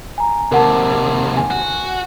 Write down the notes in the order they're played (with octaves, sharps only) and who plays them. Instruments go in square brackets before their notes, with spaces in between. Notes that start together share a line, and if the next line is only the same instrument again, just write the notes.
[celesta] G#5 A#5
[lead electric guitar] D#2 C3 [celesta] A#4 F#5 A5
[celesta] G#5
[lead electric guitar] F#4